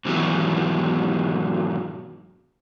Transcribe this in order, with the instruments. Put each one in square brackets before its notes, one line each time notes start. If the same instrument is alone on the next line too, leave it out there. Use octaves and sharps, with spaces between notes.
[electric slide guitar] G#2 B2 D#3 E3 F#3